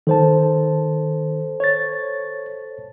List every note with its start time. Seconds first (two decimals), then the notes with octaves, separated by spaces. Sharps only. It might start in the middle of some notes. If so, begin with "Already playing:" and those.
0.07 D#3 A4 C5 A5
1.60 C#5 A6